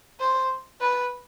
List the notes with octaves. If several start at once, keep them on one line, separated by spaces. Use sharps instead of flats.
C5
B4